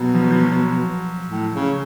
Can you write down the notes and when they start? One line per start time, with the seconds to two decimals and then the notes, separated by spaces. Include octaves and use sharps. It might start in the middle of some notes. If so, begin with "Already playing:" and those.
Already playing: B2 F#3
0.14 F3
0.22 F#3
0.31 F3
0.52 F#3
1.28 A2
1.53 C#3